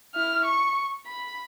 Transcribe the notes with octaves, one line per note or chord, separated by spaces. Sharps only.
E4 F6
C#6
B5